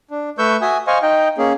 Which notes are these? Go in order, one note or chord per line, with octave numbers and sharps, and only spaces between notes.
D4
A3 B4 C#6 E6 G6
F#4 E5 G#5 D#6
C5 D#5 F5 G#5 C#6
D#4 D#5 G5
A#3 C#4 G#4